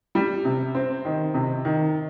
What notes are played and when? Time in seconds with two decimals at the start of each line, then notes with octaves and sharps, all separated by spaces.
0.15 G3
0.45 C3
0.75 C4
1.05 D#3
1.34 C3
1.65 D#3